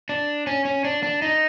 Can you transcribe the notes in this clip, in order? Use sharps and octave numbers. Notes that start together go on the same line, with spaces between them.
D4
C#4
C#4
D4
D4
D#4